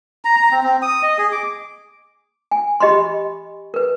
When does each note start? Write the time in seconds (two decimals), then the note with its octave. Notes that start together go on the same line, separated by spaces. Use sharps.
0.25 A#5
0.37 A#5
0.51 C4
0.63 C4
0.82 D#6
1.03 D#5
1.18 G#4
1.32 D6
2.51 G#5
2.80 G4 D#5 B5 C6
3.74 A#4 B4